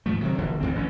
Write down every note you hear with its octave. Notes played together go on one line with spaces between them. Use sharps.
G#2 F3 A3
C3 D#3 F#3
E1 A#1 D3
A1 G2 C3 C4
A1 D3 C#4